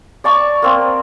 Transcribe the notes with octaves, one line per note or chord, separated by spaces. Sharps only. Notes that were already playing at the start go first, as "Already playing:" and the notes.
D5 A5 C#6
A#3 C4